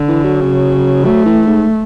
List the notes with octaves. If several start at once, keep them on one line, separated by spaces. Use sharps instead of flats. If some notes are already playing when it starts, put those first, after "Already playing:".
Already playing: D3
E3
F#3
C#3
F#3 A3
E3
G#2